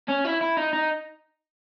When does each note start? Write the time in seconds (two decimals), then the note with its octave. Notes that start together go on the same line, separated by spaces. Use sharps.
0.08 C#4
0.25 E4
0.41 E4
0.57 D#4
0.73 D#4